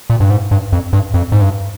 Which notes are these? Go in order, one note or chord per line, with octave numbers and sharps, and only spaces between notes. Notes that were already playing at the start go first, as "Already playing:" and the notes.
A#2
G2
G#2
G2
F2
G2
F2
G#2
G2